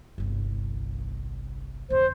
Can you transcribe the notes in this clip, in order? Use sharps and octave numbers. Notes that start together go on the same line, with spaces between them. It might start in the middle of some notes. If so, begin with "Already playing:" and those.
G1 C2
F2 D3 C5